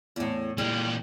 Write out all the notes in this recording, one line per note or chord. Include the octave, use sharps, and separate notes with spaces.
E2 A2
A#2 E3 G3